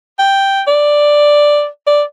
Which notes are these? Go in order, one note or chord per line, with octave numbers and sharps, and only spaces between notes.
G5
D5
D5